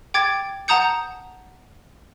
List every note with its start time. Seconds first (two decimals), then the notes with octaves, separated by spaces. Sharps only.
0.14 G5 D6 G#6 A6
0.68 F#5 A5 A#5 D#6 G6 C#7